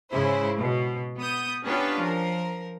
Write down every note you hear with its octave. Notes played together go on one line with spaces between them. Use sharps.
G#2 C#3 E4 C5
B2
B3 D#6 G6
B3 C#4 D4 F4 G4 B4
F3 A#4